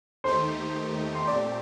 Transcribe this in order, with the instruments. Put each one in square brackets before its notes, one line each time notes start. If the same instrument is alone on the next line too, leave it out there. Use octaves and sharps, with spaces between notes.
[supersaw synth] D#2 D#3 A3 D#4 G4 [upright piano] C5 C6
[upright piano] C6
[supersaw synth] A#2 A3 C4 G4 [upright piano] D5 D6